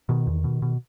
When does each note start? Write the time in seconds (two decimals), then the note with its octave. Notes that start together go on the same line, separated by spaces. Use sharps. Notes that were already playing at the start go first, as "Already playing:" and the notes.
0.09 B2 D#3
0.27 E2
0.44 B2
0.62 B2